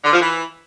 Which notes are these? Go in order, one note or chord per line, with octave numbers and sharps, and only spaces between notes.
D3
F3
E3